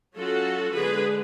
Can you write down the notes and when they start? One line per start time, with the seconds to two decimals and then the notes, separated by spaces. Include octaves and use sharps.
0.16 F#3 C#4 F4 F#4 A4
0.74 D3 G#3 B3 G#4 B4